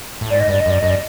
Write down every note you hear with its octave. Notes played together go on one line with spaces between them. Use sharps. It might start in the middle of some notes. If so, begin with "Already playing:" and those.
A2
G#2 D5
D#5
G2 D5
D#5
F#2 D5
F#2 D#5
D5